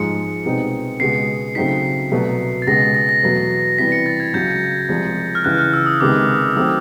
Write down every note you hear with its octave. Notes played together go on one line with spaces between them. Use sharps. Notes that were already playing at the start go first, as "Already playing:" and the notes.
Already playing: G#2 F3 G#3 C#7
C2 B2 G#3 C4 D#4
C#2 B2 G#3 C7
C#3 F#3 A3 C4 D#4 B6
C2 B2 F#3 A3
A6
C#2 B2 G#3 A#6
A6
A#6
A#6
E2 B2 F#3 A3
C3 E3 G3 B3 B6
C#7
A6
G#6
C#2 C#3 F#3 G6
C2 C3 F3 G#3
F6
C#2 C#3 E3 F#6
F6
E6
D#6
C#2 C3 D#3 G#3 B3 D6
D#3 F#3 A3 C4 D#6